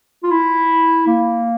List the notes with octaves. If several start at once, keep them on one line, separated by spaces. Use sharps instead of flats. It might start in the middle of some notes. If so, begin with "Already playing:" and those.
F4
E4
A#3